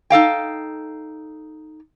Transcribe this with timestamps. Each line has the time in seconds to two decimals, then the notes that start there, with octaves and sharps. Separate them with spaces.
0.10 D#4 A4 F5 G5